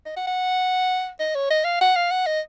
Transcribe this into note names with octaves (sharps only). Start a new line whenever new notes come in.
D#5
F#5
F#5
D#5
C#5
D#5
F5
F#5
F5
F#5
D#5